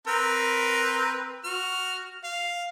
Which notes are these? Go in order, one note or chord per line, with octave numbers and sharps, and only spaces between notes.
C4 A#4 B4
F#4 F6
F5